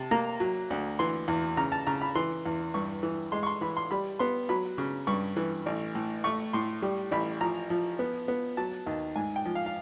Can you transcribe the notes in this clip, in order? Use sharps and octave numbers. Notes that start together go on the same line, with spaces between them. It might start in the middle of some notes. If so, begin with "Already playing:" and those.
Already playing: C3 A5
A#3 A#5
F#3
D2
E3 C6
E2
C#3 A#5
A5
C#3 A#5
B5
E3 C6
E2
G2 C#6
E3
G#3 C6
C#6
C6
E3 B5
C6
G3 B5
B3 C6
F#3 B5
C#3
G2 C#6
E3
A1
A2
A3 C#6
A2 C6
G3
A1 B5
F3 A#5
F3
B3
B3
F#3 A5
D#2
G#2 G#5
G5
F3
F5
F5